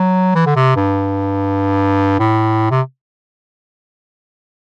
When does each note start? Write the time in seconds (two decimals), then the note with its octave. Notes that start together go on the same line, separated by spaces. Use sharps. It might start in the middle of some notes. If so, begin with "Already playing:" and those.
Already playing: F#3
0.35 E3
0.46 D3
0.56 C3
0.76 G2
2.19 A2
2.71 C3